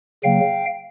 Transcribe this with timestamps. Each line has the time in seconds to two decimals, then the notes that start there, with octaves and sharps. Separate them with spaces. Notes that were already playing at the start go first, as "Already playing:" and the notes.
0.24 C#3 F#3 A#3 F5 G5